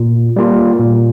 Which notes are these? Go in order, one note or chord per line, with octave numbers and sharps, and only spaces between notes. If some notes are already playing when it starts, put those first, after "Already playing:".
Already playing: A#2
G3 A#3 F4
A#2